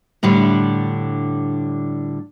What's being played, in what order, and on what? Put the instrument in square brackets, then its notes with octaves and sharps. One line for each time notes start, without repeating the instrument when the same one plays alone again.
[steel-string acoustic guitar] A2 D3 G3 D4